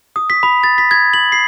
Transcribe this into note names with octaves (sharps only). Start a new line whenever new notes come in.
D#6
B6
B5
A6
B6
G#6
F#7
C7